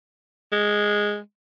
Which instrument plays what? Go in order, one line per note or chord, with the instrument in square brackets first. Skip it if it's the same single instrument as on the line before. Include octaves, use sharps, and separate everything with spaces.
[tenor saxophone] G#3